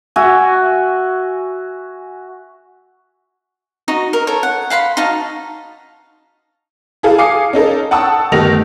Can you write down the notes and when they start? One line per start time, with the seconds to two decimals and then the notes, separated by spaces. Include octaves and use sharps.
0.16 F#4 E5 G#5
3.88 D#4 F#4 D#5
4.13 A#4
4.27 A4 A#4 C#5
4.43 F#5
4.70 F5 F#5 B5 C6
4.97 D#4 F#4 F5 A5
7.03 E4 G#4 A4 F5
7.18 F5 G#5 D6 D#6 C7 C#7
7.53 C#4 D#4 A4 A#4
7.91 F#5 G5 A5 C#6 D#6 E6
8.32 G1 D#3 A3 G4 A#6 F7